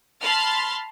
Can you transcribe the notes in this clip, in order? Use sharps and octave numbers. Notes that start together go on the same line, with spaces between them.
A5 B5 C6 F6 A6